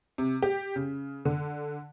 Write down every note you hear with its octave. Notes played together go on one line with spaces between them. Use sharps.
C3
G4
C#3
D3